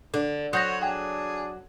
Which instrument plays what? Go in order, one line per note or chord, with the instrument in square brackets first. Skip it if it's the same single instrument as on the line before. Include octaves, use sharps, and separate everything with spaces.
[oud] D3 [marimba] D4
[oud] F#3 [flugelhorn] F#4 [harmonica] C5 C#5 [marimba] D#6 G6 A#6
[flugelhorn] D4 [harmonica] G#4 [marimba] F#5 G5